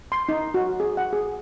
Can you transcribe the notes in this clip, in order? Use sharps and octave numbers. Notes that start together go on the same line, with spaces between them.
C6
D#4
F#4
G#4
F#5
G#4